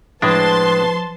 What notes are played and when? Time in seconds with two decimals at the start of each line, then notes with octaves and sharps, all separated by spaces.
0.22 A2 F3 G#3 D4 B4 A5 C6